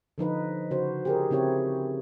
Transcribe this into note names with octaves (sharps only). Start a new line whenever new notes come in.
D3 F3 D#4 B4
C#3 F#4 C5
G4 G#4 A#4
C#3 C4 E4 G4 C#5